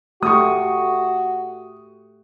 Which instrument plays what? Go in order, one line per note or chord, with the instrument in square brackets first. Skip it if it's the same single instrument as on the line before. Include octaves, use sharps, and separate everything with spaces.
[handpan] A3 G4 [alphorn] F#4 [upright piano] C#6 D#6